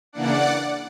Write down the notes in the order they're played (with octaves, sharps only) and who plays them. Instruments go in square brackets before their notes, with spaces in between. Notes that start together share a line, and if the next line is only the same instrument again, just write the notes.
[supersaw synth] C#3 E3 A#3 D4 D5 F#5